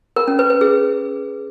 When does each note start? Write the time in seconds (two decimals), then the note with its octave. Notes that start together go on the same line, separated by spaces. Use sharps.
0.16 A#4
0.28 C#4
0.39 B4
0.50 B4
0.61 G#4